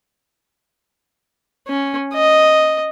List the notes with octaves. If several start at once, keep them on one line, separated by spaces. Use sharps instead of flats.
C#4
D#5